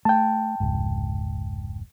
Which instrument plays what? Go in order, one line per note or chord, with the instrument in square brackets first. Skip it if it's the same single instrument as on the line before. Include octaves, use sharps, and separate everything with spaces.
[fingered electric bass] A3 [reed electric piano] G5 A5
[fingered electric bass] F1 C#2 G#2